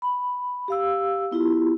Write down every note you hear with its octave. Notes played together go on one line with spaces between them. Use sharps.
B5
G4 F5 E6
B3 E4 F4 G4